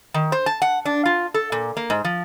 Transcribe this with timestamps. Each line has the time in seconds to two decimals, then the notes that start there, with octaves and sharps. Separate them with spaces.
0.14 D#3
0.32 C5
0.46 A5
0.62 F#5
0.85 D4
1.06 F4
1.34 A4
1.52 A#2
1.77 A#3
1.90 G#2
2.04 F3